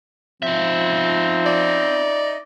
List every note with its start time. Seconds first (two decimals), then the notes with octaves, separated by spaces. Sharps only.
0.42 F3 C4 D#4 E5
1.46 D5